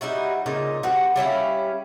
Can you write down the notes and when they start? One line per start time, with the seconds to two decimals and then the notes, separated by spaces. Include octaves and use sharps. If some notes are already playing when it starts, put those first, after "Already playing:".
0.01 G3 D#4 E4 F#4
0.46 A#2 C#3 D#4 A#5
0.83 G3 C4 F#4
1.16 G3 C#4 E4 F5